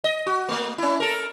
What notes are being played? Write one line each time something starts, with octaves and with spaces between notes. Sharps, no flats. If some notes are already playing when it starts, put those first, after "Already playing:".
D#5
F#4
A3 A#3
C#4 E4
A4 A#4